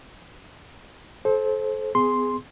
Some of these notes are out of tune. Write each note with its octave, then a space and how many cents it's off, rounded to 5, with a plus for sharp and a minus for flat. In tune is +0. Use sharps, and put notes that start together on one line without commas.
A4 -30 C5 +10
B3 +40 G#4 +0 C6 +0